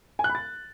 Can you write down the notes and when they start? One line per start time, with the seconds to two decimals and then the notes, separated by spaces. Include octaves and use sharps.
0.19 G#5
0.24 F#6
0.30 B5
0.35 A6